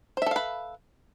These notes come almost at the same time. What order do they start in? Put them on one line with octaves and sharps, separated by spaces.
C5 E5 A4 F5 B4